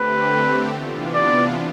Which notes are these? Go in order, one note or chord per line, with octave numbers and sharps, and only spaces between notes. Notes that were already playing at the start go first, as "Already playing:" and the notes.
Already playing: D3 A3 C4 G4 B4
C3 E3 B3 D4 F4
D5